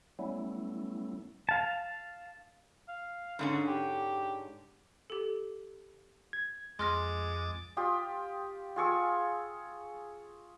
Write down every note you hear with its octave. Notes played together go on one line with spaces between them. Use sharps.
F#3 G3 A3 B3 C#4 E4
F5 A5
F5
G#2 D3 C#4
G4
G4 A4
G#6
F2 G#3 C6 D6 F6 A6 A#6
F4 G4 D#6
F4 G#4 C#6 E6